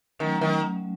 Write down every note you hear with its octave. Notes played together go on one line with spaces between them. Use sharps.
D#3 F#3 A3 C#4
D#3